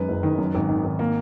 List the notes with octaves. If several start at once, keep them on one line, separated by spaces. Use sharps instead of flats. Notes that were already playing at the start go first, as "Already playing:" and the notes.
Already playing: F#2 D#3 G#3 B4
F#1
D#3
F#2
G#1
D#3
G#1
A#3